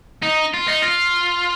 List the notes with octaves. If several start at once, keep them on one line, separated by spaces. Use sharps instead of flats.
D#4
F4
D#4
F4